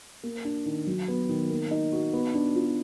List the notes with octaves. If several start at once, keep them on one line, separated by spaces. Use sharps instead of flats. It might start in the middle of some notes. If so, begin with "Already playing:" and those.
A#3
D4
D#3
F#3
B3
D#3
A#3
D#4
F#4
B3
D4
F4